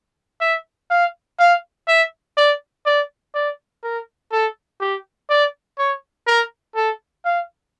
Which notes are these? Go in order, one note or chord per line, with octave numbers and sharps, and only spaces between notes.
E5
F5
F5
E5
D5
D5
D5
A#4
A4
G4
D5
C#5
A#4
A4
F5